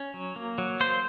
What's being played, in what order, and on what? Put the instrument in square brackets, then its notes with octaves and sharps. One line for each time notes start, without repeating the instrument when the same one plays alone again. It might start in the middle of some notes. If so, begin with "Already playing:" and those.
Already playing: [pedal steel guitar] C#4
F#3
A#3
F#3
A#3 C5